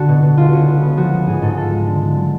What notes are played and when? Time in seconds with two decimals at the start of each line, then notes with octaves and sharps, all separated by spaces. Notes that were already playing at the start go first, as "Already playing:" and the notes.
Already playing: D3 F#4 A4
0.08 B2
0.22 B2
0.37 C#2 F4
0.53 C#4 F#4
0.67 B3 F4
0.82 B3
0.97 F3 F#4
1.13 B3
1.27 G#2 G#4
1.42 G#2 A4
1.57 F4 A4
1.72 G#3
1.87 D3
2.02 D3
2.17 F#3